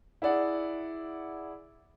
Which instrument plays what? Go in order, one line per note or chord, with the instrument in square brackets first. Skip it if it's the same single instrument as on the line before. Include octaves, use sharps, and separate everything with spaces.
[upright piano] E4 G#4 D5 F#5